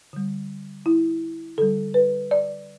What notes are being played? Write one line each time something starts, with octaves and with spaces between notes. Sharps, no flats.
D3 G3
E4
D3 G3 A4
B4
D5